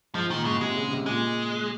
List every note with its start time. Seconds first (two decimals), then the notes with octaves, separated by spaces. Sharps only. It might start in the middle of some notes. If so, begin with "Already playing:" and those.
0.14 G#2 F3
0.30 A#2 D#3
0.45 G#2 C#3
0.60 C3 G#3
0.76 C#3
0.91 C3
1.06 A#2 G#3